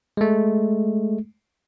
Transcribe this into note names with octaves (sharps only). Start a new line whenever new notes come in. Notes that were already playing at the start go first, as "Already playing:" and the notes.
G#3 A3